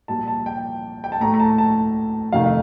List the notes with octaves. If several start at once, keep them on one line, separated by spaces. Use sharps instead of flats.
A#2 G3 A5
A5
G5
G5
A5
A2 A3 A#5
A#5
A5
A5
F2 C3 D#3 A3 F5